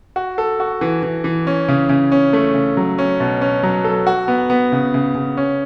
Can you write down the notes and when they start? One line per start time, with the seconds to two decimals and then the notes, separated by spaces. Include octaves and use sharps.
0.16 F#4
0.38 A4
0.60 F#4
0.81 E3
1.03 E3
1.24 E3
1.47 C#4
1.68 C#3
1.89 C#3
2.12 C#4
2.33 A3
2.54 C#3
2.77 F#3
2.98 C#4
3.20 B2
3.41 C#4
3.63 F#3
3.84 A4
4.07 F#4
4.28 B3
4.50 B3
4.72 C#3
4.94 C#3
5.15 C#3
5.37 C#4